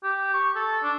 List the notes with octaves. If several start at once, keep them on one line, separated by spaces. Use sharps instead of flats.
G4
C#6
A4
D4